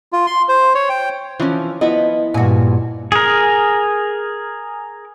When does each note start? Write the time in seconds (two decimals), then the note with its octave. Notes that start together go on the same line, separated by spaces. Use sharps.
0.13 F4
0.27 C6
0.49 C5
0.75 C#5
0.89 G5
1.40 E3 F3 C#4
1.81 F3 B3 E4 D#5
2.34 G2 A#2 F#4 G#5
3.12 G#4 A#4